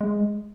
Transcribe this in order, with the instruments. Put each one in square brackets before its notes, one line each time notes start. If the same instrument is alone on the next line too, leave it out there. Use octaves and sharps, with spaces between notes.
[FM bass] G#3